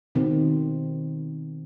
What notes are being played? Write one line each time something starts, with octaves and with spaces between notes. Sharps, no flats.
B2 D#3 C4